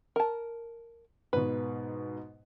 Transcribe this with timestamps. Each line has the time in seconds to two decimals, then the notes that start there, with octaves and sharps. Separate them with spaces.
0.16 A#4 A5
1.33 G#2 B2 B4